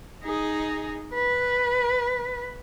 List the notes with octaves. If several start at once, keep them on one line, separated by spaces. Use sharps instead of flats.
D#4 G#4
B4